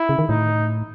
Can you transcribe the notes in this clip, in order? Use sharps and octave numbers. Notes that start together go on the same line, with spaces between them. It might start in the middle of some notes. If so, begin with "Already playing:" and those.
Already playing: E4
C#3
D#3
A2 D#4